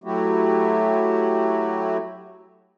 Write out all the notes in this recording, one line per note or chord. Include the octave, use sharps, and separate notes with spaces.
F#3 A3 E4 F#4 G4